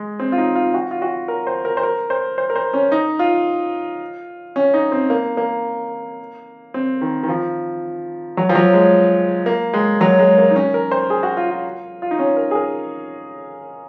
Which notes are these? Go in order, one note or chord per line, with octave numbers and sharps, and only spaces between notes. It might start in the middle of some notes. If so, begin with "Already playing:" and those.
Already playing: G#3
C4
F4
D#4
F4
F#4
F4
F#4
A#4
C5
A#4
C5
A#4
C5
C5
A#4
C5
C#4
D#4
F4
C#4
D#4
C4
A#3
A#3
C4
D#3
D#3
F3
F#3
F3
F#3
G#3
A#3
G#3
F#3
G#3
A#3
D#4
C#4
A#4
C5
G#4
F#4
F4
F4
F4
D#4
C#4
A#4
G#4
A#4